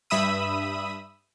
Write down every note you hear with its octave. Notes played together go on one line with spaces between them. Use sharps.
G2 E5 B5 D#6 E6 D#7